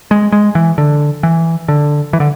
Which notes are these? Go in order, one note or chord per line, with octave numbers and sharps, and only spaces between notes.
G#3
G#3
E3
D3
E3
D3
E3
D3